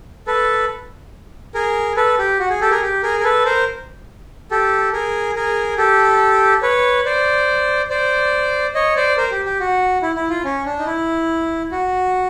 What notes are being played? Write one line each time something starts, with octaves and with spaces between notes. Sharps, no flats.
A4 B4
G#4 A#4
A4 B4
G4
F#4
G#4
G4 A4
G#4 A#4
G4
G#4 A#4
A#4
A4 B4
A#4 C5
G4 A4
G#4 A#4
G#4 A#4
G4 A4
B4 C#5
C5 D5
C5 D5
C#5 D#5
C5 D5
A#4 C5
G4
G4
F#4
E4
E4
F4
C#4
D4
D#4
E4
F#4